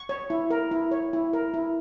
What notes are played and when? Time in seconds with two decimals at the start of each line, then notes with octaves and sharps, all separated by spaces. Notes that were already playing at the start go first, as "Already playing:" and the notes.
Already playing: C#6
0.09 C#5
0.30 E4
0.50 A#4
0.71 E4
0.91 C#5
1.13 E4
1.33 A#4
1.54 E4